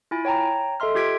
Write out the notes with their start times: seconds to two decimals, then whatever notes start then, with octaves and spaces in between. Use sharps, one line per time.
0.11 E4 F4 G#5 B5 A6 D7
0.25 C#5 G5 A5 A#5
0.80 A4 D#5 E5 C6 F6
0.95 F4 G4 G#6 B6 D7